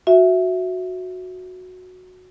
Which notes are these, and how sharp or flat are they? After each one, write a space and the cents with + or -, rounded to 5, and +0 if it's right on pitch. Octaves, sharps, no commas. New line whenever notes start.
F#4 -10 E5 +0